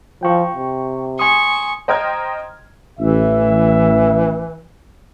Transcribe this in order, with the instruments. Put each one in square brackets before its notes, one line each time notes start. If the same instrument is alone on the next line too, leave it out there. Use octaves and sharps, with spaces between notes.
[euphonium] F3 [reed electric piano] G5 C#6
[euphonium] C3
[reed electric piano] G#5 C6 D#6 [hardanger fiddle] C#6
[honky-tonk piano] C5 D#5 G5 A#5 F6 G#6
[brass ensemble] A1 E5 [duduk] E3